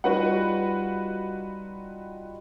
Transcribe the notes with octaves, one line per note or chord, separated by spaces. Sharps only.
G3 D#4 F4 F#4 B4 F#5